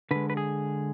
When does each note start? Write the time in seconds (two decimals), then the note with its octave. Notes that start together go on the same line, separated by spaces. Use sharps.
0.11 D3 G#3 B4
0.30 B4
0.37 G#4